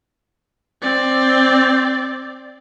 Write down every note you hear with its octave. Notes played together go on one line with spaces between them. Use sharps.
C4 D5